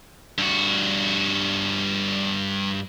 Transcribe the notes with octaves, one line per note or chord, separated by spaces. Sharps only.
G2 F#4